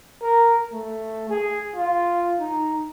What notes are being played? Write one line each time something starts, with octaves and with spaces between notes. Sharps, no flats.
A#4
A3
G#4
F4
D#4